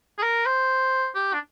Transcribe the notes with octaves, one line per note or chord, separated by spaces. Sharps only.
G#4
A#4
C5
G4
D4